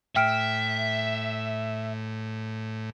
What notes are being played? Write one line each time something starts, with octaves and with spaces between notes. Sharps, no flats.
A2 E5 G5 F6 D7